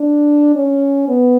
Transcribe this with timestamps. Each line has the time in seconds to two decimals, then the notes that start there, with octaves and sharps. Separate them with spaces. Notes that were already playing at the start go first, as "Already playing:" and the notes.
Already playing: D4
0.55 C#4
1.08 B3